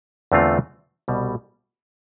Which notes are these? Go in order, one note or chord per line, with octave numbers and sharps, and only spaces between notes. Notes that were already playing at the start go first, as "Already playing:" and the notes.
E2 D3 A3 C4 F4
C2 B2 G3